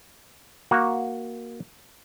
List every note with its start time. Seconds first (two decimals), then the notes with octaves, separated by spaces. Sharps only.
0.71 A#3 F#4